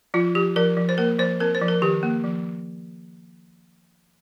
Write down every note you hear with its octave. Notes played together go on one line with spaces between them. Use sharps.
F3 F4
F3 G4
F3 A#4
F3
C5
A#3 A#4
F3 C5
C4 A#4
C5
F3
A#4
D#3 G4
A#3
F3